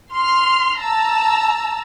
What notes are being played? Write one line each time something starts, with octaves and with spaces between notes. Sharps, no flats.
C6 F6
A5 A#5 E6